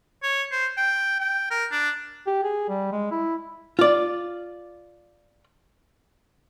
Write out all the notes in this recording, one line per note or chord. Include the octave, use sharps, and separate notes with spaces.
C#5
C5
G5
G5
A#4
D4
G4
G#4
G3
G#3
E4
F4 D5